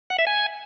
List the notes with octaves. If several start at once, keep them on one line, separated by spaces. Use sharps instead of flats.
F#5
E5
G#5